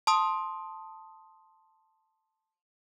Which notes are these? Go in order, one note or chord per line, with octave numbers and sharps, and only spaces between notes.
A5 C6 D#6